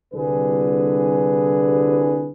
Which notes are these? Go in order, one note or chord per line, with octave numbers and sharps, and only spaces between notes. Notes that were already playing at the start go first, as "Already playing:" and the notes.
C2 D3 G#4 B4